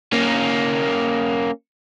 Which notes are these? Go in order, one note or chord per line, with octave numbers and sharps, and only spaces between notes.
A#3 C#4